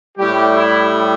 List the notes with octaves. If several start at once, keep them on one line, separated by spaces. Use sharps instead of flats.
A2 G3 G4
E4